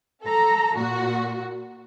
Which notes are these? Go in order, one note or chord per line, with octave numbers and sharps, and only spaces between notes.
A4 A#5
A#2 F#4